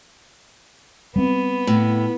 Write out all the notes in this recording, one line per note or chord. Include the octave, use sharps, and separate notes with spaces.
G3 B3 C4
A2